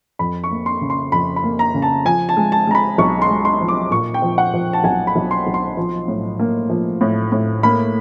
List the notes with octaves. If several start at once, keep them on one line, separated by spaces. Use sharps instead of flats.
F2 B5
C#6
A#3
C6
C#3
C6
F2 B5
B5
A#3
A#5
C#3
A5
F3 G#5
A5
G#3
A5
G#3 A#5
B5
B1 C#6
C6
G#3
C6
F3
D6
A#2 C#6
G5
F3
F#5
F3
A5
B1 G#5
B5
B1
C6
B1
C6
F3
A2
A#3
F3
A2
A2
A#3 B5